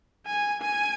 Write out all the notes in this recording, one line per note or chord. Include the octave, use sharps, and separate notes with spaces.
G#5
G#5